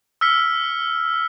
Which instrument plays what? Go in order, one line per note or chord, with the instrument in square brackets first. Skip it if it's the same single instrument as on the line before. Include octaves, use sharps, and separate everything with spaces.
[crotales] E6 F6 B6 C#7